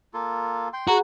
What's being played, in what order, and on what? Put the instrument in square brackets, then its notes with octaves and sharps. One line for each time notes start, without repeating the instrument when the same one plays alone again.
[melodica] A#3 F4 A4
G5 C6
[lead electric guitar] F#4 [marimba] G#4 A#5 [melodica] B4